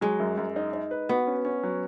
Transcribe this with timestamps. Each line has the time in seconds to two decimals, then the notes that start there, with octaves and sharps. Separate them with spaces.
0.01 F#3 G#3
0.20 F#2
0.38 F#2
0.56 D#4
0.73 D#4
0.91 B4
1.09 B3 F#4
1.27 C#4
1.45 C#4
1.63 F#3